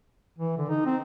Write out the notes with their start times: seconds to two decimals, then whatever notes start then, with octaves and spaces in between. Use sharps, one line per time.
0.39 E3
0.57 D3
0.69 D#4
0.86 C4